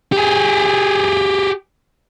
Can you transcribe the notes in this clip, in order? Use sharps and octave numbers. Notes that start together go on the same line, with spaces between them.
G4 G#4